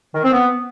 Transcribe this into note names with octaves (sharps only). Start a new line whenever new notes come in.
D#3
C4
B3